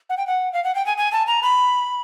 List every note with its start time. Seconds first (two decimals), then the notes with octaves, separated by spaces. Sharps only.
0.10 F#5
0.17 G5
0.27 F#5
0.53 F5
0.64 F#5
0.75 G5
0.86 G#5
0.98 G#5
1.12 A5
1.27 A#5
1.43 B5